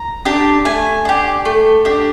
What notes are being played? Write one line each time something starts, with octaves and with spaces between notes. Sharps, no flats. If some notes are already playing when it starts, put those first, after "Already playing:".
Already playing: A#5
D4 G4 A5
A3 G#5
D4 G4
A3
D4 G4